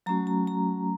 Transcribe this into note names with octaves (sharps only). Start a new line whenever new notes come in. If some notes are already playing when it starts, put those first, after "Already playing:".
F#3 A3 C#4 F#4 A#5
A#5
A#5